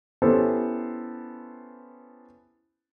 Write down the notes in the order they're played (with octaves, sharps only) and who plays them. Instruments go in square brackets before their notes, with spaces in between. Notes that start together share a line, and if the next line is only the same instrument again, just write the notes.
[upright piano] B3 C#4 E4 G4 A4 C5